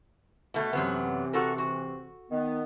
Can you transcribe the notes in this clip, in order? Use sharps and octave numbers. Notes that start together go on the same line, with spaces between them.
B2 A3
F#2 C3 E3 F#3 B3
F#4 A4 A#4
F#4
D#3 B3